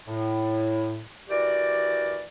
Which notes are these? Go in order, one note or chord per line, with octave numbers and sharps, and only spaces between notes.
A2
E3 F#4 G4 A#4 D5